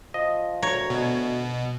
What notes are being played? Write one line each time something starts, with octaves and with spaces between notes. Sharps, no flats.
F3 D#5
D2 C#5 A#5
B2